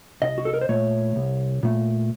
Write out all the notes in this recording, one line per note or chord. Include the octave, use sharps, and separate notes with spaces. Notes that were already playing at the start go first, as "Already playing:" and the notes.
C2 D#5
F#4
A4
A#4
C5
A#2 A3 C#5
C2
A#2 A3